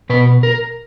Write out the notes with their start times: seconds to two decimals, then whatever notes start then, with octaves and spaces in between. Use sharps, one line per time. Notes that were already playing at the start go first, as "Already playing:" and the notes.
0.10 B2 B4
0.43 A#4